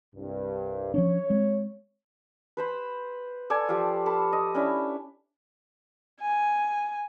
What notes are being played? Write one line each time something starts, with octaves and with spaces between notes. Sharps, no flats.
C2 G2
F3 C#4 D4 C#5
G#3 C4
B4 C5 B5
A4 D5 G#5
F3 F4 G4 F5
A4 A5 B5
D#5
C#4 D4 E4
G#5